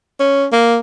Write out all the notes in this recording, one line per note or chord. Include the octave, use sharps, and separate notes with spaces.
C#4
A#3